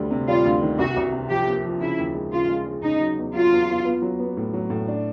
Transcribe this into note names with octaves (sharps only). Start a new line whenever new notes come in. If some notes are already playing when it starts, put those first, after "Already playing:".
Already playing: D2 G3
C3
G3 F4
D2
D#3
C2 F#4
C2
C3
F3 G4
A#3
F3
C#3 E4
D#2
G#3
C#3 F4
G#3
G#3
C#3 D#4
F#3
E2
F#3 F4
E2
E2
B3
F#3
B3
A2
F#3
A2
D4